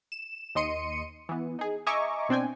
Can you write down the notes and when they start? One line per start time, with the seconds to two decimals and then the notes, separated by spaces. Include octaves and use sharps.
0.12 E7
0.55 D#2 D#5 C6 C#7 D#7
1.29 E3 B3
1.59 D#4 G#4
1.87 D#5 E5 G#5 A#5 C#6 D6
2.29 B2 C4 D4 G5 G#5